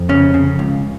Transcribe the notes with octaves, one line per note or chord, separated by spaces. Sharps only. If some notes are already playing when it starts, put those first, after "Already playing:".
Already playing: F2
C#3 C#4
C#3
C#2